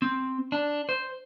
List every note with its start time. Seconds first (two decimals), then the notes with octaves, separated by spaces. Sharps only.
0.02 C4
0.52 D4
0.89 C5